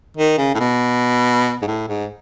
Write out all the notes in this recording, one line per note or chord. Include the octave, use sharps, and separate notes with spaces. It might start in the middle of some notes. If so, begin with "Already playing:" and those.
D#3
C#3
A2
B2
G#2
A2
G#2